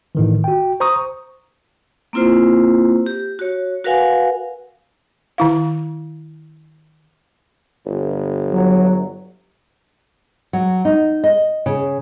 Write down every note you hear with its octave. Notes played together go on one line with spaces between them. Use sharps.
A2 D#3 E3
F#4 G5
C5 A#5 C#6 D#6
A#3 C4 E4 F4 C5
G4
F#4 C#5
F#4 A#4 B4 F5 F#5 G#5
D#3 E4 F5
G1
F#3
F#3
D#4
D#5
C#3